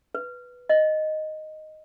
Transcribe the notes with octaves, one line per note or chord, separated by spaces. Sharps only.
B4
D#5